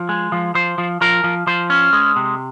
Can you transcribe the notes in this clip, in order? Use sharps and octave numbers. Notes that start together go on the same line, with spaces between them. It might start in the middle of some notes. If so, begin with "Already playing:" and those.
Already playing: F3
G#3
F3
F3 C5
F3
F3 A#4
F3
F3 C5
C#4
G#3
C3